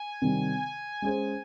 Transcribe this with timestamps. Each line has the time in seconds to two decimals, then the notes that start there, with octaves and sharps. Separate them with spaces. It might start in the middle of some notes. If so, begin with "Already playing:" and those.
Already playing: G#5
0.22 C3 D#3 G3
1.02 G#3 C#4 G#4 C5